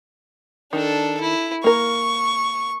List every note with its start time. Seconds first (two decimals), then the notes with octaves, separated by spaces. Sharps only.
0.73 D#3 D4 A4
1.21 E4
1.64 A#3 A#4 C#6